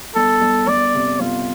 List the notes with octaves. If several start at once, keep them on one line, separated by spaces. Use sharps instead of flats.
G1 A4
G1
G1 D5
C3
G1 F4